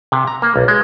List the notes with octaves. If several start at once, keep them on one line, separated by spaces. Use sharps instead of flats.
C3
A#5
A#3
B1
G#3